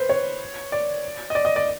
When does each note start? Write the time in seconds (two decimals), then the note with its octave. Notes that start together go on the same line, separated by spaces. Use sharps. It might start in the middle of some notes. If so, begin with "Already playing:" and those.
Already playing: B4 C5
0.09 C#5
0.72 D5
1.30 D#5
1.35 D5
1.45 D#5
1.56 D5